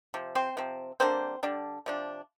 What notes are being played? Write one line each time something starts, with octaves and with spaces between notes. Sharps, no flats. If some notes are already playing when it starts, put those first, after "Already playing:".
C3 F3
C4 C5
C3 F3 C4
D3 G3 A#3 C4 D4 C5
D3 G3 D4
C3 F3 D4